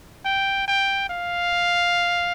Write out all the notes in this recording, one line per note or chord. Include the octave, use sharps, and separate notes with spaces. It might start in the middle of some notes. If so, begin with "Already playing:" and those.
G5
G5
F5